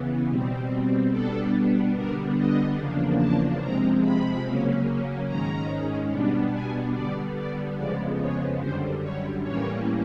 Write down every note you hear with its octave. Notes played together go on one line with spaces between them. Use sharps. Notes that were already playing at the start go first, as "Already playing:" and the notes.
Already playing: C#3 E3 B3
B2 G3 C4
B2 G3 B3 D4 A4
D3 G3 B3 D4 A#4
D#5
E2 C#3 F3 A#3 D4
A5
C3 F3 G#3 C4 A#5
B5
C#3 F#3 A#3 C#4
G#2 D#3 G#3 C#4 A#5
B2 G3 B3 D4
G#5
D3 G3 B3 D5
D5
F2 C#3 F3 G#3 B3 D5
C#5
F#2 D3 G3 C5
C#5
A2 E3 G3 A#3 C#4 C#5